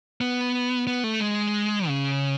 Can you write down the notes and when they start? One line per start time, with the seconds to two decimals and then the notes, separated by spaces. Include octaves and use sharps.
0.21 B3
0.87 B3
1.04 A3
1.20 G#3
1.87 C#3